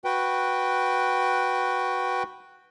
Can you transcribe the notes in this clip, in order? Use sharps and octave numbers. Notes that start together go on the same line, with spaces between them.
F#4 B4 G5